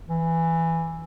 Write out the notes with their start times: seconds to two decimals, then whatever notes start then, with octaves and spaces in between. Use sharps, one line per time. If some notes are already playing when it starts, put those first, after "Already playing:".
0.08 E3